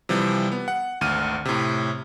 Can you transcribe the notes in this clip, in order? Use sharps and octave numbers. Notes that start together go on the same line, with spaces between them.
C3 E3 F3 G3
B3
F#5
G#1 D2 F6 D#7
A2 C3